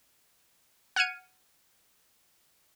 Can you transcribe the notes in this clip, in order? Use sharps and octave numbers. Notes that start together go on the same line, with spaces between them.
F#5 F6 G#6 C#7 D#7